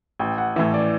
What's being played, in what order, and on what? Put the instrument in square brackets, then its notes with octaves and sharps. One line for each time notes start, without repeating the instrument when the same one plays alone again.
[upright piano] A1 [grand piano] G5
[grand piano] F#5
[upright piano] A2 E3 [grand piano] E5
[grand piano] D5